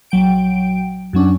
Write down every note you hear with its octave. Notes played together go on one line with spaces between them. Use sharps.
A#1 F#3 G5 D7
F#2 F#3 C#4 D4